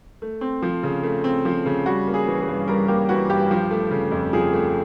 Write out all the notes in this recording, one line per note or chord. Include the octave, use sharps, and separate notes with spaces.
A3
C4
F3
C#3
A3
C4
F3
C#3
G3 F#4
A#3
G#4
E3
G#4
G2
G3 A#4
A#3 G4
E3 F#4
G2 G4
F3
A3
C#3
F2
F3 G#4
A3